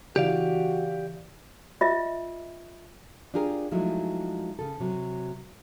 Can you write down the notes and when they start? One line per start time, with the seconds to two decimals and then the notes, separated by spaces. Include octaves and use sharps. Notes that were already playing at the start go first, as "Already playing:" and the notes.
0.16 C#3 E3 F#4 G4 D5 F5
1.81 F4 D#5 E5
3.34 D4 F4 G4 G#4 A#4
3.71 F3 F#3 G#3 A3 D#4 E4
4.59 C#3 A4
4.80 C3 F#3